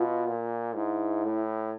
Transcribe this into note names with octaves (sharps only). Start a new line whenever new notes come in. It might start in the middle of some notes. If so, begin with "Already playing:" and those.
Already playing: B2 F4
A#2
G#2 E4
A2